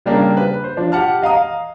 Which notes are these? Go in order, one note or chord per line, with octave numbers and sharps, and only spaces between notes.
C#3 G3 A#3 D4
B4
C5
F3 D4
G4 F#5 A5 F6
D#5 F5 A#5 D#6